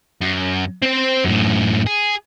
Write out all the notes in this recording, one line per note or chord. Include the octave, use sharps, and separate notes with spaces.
F#2
C4 C5
F#2 A2
G#4